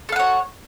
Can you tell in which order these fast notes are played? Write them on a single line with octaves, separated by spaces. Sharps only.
A4 F5 F#5 C#5